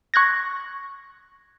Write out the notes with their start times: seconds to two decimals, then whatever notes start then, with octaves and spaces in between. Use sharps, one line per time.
0.14 C#6 F#6 G#6 A#6